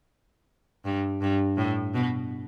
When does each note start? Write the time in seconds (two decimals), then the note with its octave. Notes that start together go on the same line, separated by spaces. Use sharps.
0.85 G2
1.22 G2
1.57 A2
1.94 B2